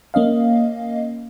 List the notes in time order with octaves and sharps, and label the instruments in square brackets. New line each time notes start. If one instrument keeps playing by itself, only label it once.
[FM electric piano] A#3 C#4 D#5 F5